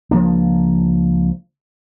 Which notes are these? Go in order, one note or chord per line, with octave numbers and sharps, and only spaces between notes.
C#2 F3 A#3 D4